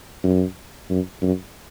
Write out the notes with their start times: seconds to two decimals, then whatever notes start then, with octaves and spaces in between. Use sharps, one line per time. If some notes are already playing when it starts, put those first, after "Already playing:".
0.24 F#2
0.90 F#2
1.22 F#2